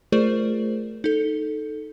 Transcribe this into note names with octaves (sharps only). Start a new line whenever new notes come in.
A3 F4 G#4 A#4 C5 D5
D#4 A4